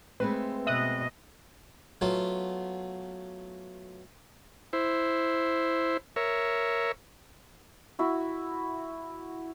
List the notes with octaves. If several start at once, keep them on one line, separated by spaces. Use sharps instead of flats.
G#3 A3 C4 B4
B2 D#5 E5 D#6 F#6
F#3 A3 B3 F4
E4 C5
A#4 C#5 E5
E4 F#4